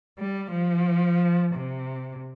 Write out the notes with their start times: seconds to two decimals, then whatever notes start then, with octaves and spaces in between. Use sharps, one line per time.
0.18 G3
0.51 F3
1.53 C3